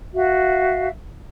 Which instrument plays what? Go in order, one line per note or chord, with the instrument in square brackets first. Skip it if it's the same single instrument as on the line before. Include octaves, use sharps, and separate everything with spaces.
[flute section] F#4 E5 F5